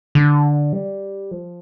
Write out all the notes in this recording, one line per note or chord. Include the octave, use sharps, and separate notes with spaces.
D3
G3
F3